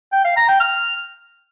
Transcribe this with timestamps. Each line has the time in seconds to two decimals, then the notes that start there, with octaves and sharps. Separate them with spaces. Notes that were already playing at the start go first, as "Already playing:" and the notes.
0.13 G5
0.25 F5
0.37 A#5
0.48 G5
0.60 F6